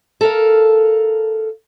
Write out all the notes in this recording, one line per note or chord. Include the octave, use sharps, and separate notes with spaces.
A4 A#4 F5